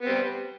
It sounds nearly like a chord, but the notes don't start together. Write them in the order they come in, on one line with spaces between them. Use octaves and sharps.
B3 C4 G3